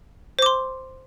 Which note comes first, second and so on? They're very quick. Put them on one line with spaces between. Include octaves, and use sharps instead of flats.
C5 D6 C6